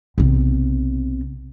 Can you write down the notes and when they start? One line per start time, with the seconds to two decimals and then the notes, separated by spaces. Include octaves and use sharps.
0.18 B1 C3